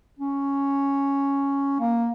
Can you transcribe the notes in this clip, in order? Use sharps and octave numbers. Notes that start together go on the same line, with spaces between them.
C#4
A#3